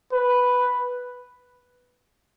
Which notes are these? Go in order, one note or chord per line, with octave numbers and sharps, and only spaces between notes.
B4